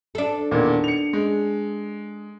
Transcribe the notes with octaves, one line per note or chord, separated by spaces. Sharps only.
D4 A4
E2 A#2 D#3
C#7 F7
G#3